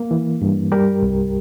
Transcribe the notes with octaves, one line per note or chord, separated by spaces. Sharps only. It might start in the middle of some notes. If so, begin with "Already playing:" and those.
Already playing: A#3
E3
G2
G3 G4 A#4
C2